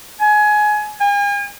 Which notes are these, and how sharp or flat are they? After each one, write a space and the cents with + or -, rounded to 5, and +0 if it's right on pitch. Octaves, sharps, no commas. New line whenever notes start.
G#5 +20
G#5 -40